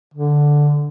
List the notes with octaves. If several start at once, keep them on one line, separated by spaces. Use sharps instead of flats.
D3